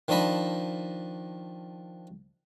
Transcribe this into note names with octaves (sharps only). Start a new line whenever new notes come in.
D#3 F3 D4 D#5 B5